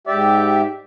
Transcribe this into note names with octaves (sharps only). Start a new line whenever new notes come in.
G#2 G4 D5 E5